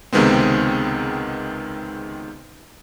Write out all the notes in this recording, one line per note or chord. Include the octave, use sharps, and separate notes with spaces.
C#2 C3 D#3 G#3 B3 C4